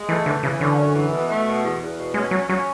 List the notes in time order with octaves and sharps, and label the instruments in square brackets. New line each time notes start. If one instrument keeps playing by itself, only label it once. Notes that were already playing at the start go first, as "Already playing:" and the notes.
Already playing: [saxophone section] G#3
[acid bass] E3 [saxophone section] A3
[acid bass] D3 [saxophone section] E3
[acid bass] C#3 [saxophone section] E3
[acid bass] D3 [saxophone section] C#4
[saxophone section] F#2
E3
B2
A3
B2
E2
E2
B2
[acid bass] G#3 [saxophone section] C#4
[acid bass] F#3 [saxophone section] C#4
[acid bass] F#3 [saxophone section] C#4